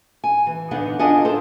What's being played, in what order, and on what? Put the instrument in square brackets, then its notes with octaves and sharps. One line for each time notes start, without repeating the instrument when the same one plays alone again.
[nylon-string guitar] G#5
E3
E2 D3 B3 D#4 D#5 F#5
D4 F4 A4 D#5 F#5 G#5
A4 A#4 C5 C#5